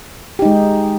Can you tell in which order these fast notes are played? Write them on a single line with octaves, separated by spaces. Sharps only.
G4 D#4 G#3